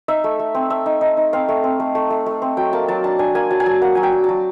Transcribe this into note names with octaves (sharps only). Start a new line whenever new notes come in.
D#4 E5
A3
A3
C4
A3 E5
D#4
D#4
D#4
C4 F5
A3
C4
A3
A3
A3
A3
C4
F#3 G5
A#3 A5
F#3 A5
D4 A5
D4 G#5
A#3 G#5
F#3 A5
G#5
F#3 A5
A#3 F#5
F#3 G#5
G5
F#3
F#3 A5